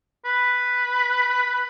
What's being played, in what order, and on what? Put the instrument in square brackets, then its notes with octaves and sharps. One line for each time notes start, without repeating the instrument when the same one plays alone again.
[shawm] B4